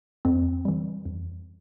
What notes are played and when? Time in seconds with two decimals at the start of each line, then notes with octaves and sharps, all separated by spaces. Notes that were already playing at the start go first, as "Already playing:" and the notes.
0.25 F2 C4
0.65 E3 G3
1.05 F2